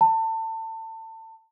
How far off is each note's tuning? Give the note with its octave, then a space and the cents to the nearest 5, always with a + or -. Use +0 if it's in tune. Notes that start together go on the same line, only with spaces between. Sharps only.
A5 +30